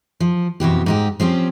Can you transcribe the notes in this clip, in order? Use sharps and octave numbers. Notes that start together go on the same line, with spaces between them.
F3
F2 B2 E3 G4
G#2 D#4 G4
F3 C4 C#4 G4